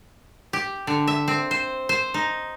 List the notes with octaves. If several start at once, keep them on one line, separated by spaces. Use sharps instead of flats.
G4
D3
E5
C4
C5
C5
D#4